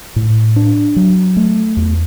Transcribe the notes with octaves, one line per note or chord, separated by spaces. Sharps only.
A2
D4
F#3
A3
E2